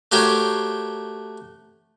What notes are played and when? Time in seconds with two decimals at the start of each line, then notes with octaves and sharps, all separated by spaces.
0.12 A3 F#4 G4 A#4 C5 C#5